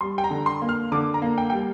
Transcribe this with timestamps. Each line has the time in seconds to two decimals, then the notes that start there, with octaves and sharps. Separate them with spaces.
0.01 G3 C6
0.18 G5
0.24 A#5
0.30 D3
0.46 C6
0.62 A#3
0.69 F6
0.92 D3 D6
1.14 A#5
1.22 A#3
1.38 G5
1.50 G3 G5